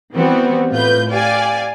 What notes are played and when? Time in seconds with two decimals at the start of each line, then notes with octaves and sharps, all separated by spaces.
0.15 E3 G3 B3 C4 F#4
0.70 A2 F4 B4 G6
1.10 G4 D5 F5 G#5